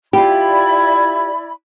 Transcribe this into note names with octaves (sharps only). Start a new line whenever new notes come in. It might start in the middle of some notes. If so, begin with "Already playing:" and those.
E4 F4 G4 D5 B5